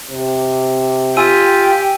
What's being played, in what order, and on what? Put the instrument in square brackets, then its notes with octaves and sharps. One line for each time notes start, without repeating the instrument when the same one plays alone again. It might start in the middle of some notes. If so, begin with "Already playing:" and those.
[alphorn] C3
[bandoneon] F4 [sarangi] G4 [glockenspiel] G#5 E6 D#7